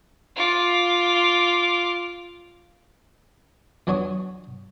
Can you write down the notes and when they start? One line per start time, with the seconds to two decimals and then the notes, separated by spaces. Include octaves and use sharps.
0.36 F4 D6
3.87 E2 F#3 D4 C#5 C#6 D#6